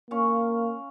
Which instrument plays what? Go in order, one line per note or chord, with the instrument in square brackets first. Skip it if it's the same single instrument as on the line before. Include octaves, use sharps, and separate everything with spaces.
[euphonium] A#3 [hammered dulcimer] C#4 F5 C#6